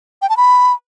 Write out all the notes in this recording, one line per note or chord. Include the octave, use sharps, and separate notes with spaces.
G5
A5
B5